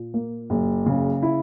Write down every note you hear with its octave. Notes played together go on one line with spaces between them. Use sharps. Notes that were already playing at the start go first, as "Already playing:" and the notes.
Already playing: A#2
A#3
F#1
C#3
E4